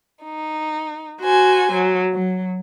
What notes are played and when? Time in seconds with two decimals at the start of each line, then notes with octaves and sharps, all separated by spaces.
0.23 D#4
1.22 F#4 C5 G#5
1.72 F#3
2.13 F#3